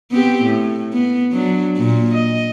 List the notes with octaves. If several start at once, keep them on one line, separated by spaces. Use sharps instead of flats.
B3 C4 G4
A2
B3
F#3 D4
A#2
D#5